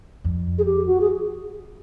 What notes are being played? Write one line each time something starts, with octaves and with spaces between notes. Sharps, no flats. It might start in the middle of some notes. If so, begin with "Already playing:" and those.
F2
G#4
G4
F#4
G#4